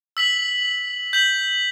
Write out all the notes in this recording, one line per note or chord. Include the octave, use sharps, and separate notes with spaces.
E6 B6 F#7
G6 B6 F#7